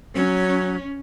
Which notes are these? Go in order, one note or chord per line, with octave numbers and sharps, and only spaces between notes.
F#3 C#4